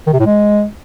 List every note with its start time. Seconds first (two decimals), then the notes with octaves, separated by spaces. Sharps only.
0.06 D#3
0.13 C3
0.19 A2
0.26 G#3